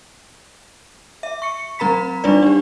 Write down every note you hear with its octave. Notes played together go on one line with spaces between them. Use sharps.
E5
C#6 C#7
F#3 C4 A#4 A#5 B5 B6
G3 D4 D#4 B4 D5
D4 G4